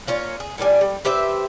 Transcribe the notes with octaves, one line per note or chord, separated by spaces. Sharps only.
A#3 C#4 F4
G#4
A2 D#3 G3 G#5
G3
G4 B4 C5 E5